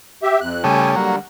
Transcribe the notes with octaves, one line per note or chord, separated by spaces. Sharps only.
G4 E5
F2 F#6
C#3 G3 A3 G#5
D3 F#3 G3 A#3